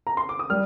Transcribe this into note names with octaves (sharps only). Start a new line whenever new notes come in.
A#5
C6
D6
D#6
G3 F6